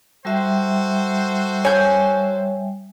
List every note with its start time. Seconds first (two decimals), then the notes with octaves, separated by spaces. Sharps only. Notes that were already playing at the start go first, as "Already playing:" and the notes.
0.25 G3 F#4 A4 C5 E5 G5
1.65 C#5 G#5 G6